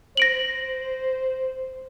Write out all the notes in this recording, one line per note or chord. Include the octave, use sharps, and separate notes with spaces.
C5 A#6 D7 F#7